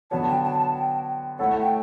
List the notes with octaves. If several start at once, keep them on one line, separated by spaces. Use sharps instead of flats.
D3 F#3 B3 F#4 C#5 A5
G5
A5
A5
G5
A3 E4 A4 C#5 F#5
G5